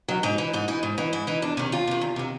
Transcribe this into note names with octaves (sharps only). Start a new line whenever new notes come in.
D#3 F#3
G#2 D#4
E3 D#4
G#2 D#4
E3 D#4
G#2
E3 D#4
G#2 E4
E3 D#4
E2 D4
C3 D#3 C#4
E2 F4
C3 D#3
E2
C3 D#3